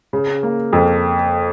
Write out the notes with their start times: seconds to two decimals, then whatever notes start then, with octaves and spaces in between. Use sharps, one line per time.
0.13 C#3
0.43 A#3
0.73 F2